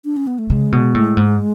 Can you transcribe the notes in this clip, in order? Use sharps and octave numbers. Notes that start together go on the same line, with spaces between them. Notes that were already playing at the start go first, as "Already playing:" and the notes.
D4
C#4
B3
A3
C#3 G#3
B2
A2
G#2